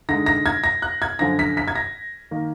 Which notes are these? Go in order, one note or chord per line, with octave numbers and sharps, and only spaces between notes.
D3 G#3 D#4 A#6
A#6
G#6
A#6
F#6
G#6
F#2 D3 F3 A#6
B6
B6
G#6
A#6
D#3 A#3